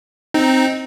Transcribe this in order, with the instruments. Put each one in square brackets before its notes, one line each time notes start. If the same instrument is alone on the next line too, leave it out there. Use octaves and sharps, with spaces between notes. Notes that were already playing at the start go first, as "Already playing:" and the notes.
[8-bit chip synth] C4 D#4